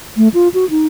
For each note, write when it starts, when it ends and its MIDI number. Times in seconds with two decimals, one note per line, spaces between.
0.17 0.28 57
0.34 0.48 65
0.54 0.68 66
0.70 0.87 63